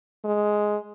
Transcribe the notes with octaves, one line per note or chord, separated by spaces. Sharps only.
G#3